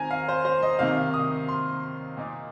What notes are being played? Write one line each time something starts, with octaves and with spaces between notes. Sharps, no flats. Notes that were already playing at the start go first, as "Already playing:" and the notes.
Already playing: D#3 C4 G#5 A#5
F5
C5
C5
D#5
C3 D#3 A#3 D#4 F5
D#6
C6
A#2 A#3 D#4